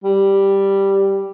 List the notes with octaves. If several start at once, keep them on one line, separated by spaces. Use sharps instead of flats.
G3